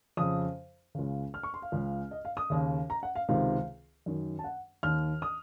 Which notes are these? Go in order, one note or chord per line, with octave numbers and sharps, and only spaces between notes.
F2 C#3 D#6
C#2 C#3
F6
C#6
C6
F5
C#2 C#3
D#5
F5
D#6
D#2 C#3
A#5
F#5
F5
C#2 C3 D#3 F5
F#2 D#3
A5
F#5
D#2 D#3 F6
D#6